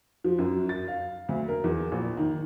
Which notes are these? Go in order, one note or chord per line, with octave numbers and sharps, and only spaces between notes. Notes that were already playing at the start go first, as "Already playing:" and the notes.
F3
F#2
A6
F5
D2
A#4
E2
A#1
D#3